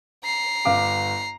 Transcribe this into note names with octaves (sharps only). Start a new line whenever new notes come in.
A#5 C7
G1 F5 D6